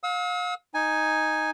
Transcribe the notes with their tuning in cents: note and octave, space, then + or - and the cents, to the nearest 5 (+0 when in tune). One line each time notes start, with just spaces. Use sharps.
F5 +40 E6 -45
D#4 +0 G#5 +0